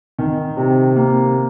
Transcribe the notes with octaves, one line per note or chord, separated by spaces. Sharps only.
D#3
C3
A#3